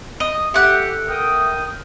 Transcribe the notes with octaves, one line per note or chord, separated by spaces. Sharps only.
D#5
A3 G4 F#5
A#4 G5 D#6